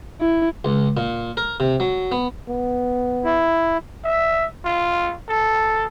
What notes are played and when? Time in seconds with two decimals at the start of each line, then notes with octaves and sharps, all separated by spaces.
0.21 E4
0.65 C#2
0.97 A#2
1.37 A#4
1.60 C3
1.80 F#3
2.12 B3
2.49 B3
3.25 E4
4.04 E5
4.65 F4
5.29 A4